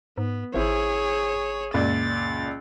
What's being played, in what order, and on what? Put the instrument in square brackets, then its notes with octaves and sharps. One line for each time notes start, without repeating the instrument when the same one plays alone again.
[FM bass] G#2 [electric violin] B3
[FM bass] G#1 [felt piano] E4 C5 [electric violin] G#4 C#5
[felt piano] C#2 A#2 D5 [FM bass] F#2 [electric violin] A6